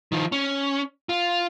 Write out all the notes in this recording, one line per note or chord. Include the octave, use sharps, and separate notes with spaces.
D#3 F3
C#4
F4